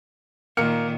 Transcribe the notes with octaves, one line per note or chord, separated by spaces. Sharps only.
A#2 D#3 A#3 F6 C#7